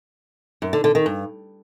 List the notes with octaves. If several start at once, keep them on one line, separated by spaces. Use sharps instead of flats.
F#2
D3
D3
D#3
G2